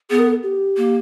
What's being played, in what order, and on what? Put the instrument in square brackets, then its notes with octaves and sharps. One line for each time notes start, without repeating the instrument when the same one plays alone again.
[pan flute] B3 [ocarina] G#4
[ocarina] A#4
A4
G4
[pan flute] A#3